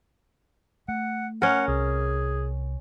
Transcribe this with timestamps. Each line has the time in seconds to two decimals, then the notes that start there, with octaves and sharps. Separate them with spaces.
0.88 A3 F#5
1.42 C#4 A#4 F#5
1.68 C2 G#4